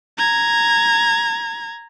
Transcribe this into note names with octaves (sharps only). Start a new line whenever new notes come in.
A#5 G#6